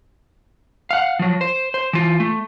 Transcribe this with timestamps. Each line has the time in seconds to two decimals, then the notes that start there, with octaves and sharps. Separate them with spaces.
0.91 F5 F#5
1.19 F3 F#3
1.41 C5
1.74 C5
1.93 E3 F4
2.20 A3